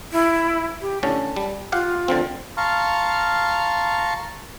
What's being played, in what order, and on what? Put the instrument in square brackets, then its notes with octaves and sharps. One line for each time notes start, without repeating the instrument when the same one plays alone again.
[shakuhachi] E4
G4
[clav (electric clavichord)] A2 D3 C#4 [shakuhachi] A5
[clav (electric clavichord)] G3
[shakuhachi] F4 [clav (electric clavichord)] G4 F5 F#5
[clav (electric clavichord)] D3 F3 C4
[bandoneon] F5 A5 A#5 C6 C#6 F6